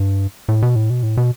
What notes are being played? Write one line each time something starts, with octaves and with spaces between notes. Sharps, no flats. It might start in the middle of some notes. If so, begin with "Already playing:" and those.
Already playing: G2
A2
B2
A2
B2
A2
B2